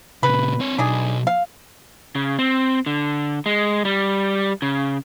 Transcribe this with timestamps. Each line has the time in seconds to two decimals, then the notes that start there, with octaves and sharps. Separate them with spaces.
0.23 A#2 C#3 B4
0.60 C4 C#5
0.78 B1 D4 D#4 G#4
1.27 F5
2.15 C#3
2.39 C4
2.86 D3
3.46 G#3
3.85 G3
4.62 C#3